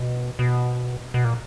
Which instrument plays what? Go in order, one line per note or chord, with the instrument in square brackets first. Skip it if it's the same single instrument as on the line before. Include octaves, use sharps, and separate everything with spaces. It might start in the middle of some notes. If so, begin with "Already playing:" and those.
Already playing: [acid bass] B2
B2
B2
A#2